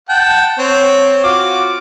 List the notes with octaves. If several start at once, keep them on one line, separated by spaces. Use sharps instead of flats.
F#5 G5 A5
C4 C#5
F4 F#4 D6